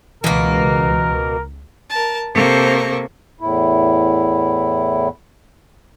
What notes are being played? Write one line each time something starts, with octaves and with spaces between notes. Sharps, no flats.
C#2 B2 E3 A#3 A#4
A#4 A5
C3 A#3 A4 C5 C#6
E2 A2 E4